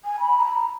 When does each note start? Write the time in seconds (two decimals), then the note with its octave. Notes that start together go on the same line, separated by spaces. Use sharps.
0.05 G#5
0.20 B5
0.38 A#5
0.46 B5
0.56 A#5